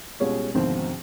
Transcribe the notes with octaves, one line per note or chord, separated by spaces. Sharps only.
B2 G3 G#3 C#4 F4
D2 G#2 B2 D#3 F3 C4